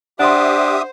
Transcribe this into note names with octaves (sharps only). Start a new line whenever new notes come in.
D4 G4 C5 E5 F#5 C6 D#6